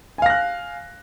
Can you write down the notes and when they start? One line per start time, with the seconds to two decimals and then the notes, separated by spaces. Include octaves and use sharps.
0.18 G#5
0.22 F5
0.26 A#6
0.30 F#6